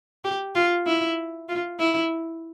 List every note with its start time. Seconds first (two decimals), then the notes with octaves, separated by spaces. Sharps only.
0.24 G4
0.55 F4
0.86 E4
1.49 F4
1.79 E4